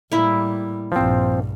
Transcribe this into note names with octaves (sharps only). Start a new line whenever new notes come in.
A2 G3 A#3 E4
A#1 G2 F3 C4